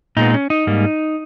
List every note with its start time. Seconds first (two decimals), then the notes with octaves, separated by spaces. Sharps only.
0.17 A#2 G#3 B3 D#4
0.34 C#4
0.50 D#4
0.67 G#2 G3 A#3